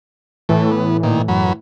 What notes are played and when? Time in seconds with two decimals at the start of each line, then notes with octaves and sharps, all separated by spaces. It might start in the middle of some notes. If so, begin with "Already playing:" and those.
0.49 A2 E3 A3
0.72 B3
1.03 A#2 D#3
1.28 F#2 F#3 B5